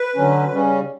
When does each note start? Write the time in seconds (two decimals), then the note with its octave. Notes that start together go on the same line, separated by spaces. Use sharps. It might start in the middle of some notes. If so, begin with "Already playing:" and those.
Already playing: B4
0.16 D3 F#3 C#4
0.52 C#3 G3 C#4